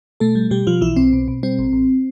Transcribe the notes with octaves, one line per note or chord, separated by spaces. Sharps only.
B2 A3 A4
G3
B2 G3 G4
B2 F3 F4
B1 E3 E4
B1 C4
B2
B2
G3 C4
A1
A1